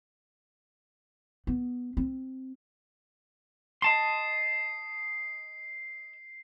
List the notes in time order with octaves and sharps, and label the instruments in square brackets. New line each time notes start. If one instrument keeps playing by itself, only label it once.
[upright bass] B3
C4
[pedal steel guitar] D#5 A5 C6 [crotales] C7